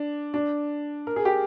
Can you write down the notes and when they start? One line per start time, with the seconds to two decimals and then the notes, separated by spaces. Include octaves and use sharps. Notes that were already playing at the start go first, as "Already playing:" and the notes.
Already playing: D4
0.34 D4
1.07 A#4
1.16 G#4
1.25 G4